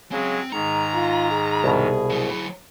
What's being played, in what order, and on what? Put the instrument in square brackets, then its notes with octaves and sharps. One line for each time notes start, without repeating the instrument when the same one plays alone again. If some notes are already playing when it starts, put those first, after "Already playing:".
[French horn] C#3 [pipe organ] F#3 G#3 [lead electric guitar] C4
[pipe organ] G#2 D#3 [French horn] G#3 [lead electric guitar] A#5
[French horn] F4
G#4
[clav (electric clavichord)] C2 B2
[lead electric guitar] F#3 E4